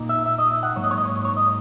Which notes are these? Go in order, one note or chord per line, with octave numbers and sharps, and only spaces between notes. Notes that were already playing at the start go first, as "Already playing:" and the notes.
Already playing: A#2 A#3 D#4
E5
E5
D#5
E5
F#5
G#2 F#3 A#3 C#5
D#5
C#5
D#5
C#5
C#5
D#5